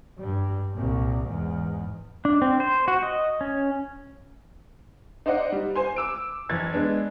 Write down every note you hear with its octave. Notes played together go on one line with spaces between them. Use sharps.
G2 G3
C2 A#2
E2 G#2
D4
C4
C5
F#4
D#5
C#4
D#4 C5 D5 D#5 F#5
G3
C5 G#5 C6
D6 E6 D7
F#1 E3 G#6 A6
G#3 B3 D4